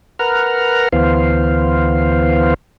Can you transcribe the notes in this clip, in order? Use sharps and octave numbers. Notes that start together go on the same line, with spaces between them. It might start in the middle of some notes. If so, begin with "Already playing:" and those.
A#4 B4 F#5 A#5 F6
D2 E3 B3 C5 F5